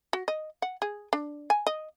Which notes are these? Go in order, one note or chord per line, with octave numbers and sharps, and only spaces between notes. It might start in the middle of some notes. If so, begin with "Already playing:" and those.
F#4
D#5
F#5
G#4
D4
G#5
D#5